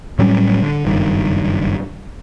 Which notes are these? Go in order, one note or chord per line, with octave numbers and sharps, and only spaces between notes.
A2 F#3 G3 C#4
D3
F#1 G2 D#3